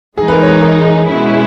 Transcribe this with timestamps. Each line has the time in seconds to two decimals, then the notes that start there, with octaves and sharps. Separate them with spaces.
0.17 E3 G#3 D#4 G#4
0.28 B4
0.32 A#4
0.43 C#5
0.48 B4
0.62 A#4
0.85 G#4
1.08 B2 G#3 C#4 E4